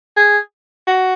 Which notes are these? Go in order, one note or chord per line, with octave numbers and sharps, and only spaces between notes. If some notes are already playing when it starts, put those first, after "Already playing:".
G#4
F#4